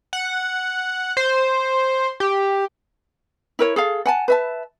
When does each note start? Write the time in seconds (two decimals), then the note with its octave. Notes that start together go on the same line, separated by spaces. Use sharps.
0.13 F#5
1.17 C5
2.20 G4
3.59 E4 A#4 C#5
3.76 G#4 A4 F5
4.05 F#5 G#5 A5
4.28 B4 E5 A5